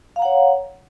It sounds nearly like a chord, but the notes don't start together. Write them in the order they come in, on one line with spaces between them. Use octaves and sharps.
F5 A#5 F#5 C#5